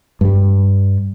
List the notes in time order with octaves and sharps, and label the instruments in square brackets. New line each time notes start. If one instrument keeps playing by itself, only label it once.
[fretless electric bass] G2 G3